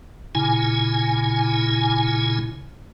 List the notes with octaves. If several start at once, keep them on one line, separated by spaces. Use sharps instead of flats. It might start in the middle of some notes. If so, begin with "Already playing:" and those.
A#2 C#3 E4 G#5